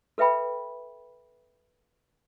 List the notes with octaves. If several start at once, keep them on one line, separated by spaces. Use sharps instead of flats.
A4 B4 E5 G5 B5